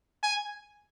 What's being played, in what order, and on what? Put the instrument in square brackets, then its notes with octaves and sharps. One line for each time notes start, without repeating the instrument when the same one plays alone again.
[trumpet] G#5